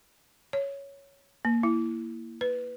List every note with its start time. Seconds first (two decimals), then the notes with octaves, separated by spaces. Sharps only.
0.53 C#5
1.45 A#3
1.63 E4
2.41 B4